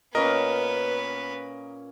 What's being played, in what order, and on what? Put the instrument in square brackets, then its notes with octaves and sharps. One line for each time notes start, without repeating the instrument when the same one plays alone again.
[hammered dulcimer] A#2 C#4 [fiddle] B3 B4 [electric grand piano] A#4 D#5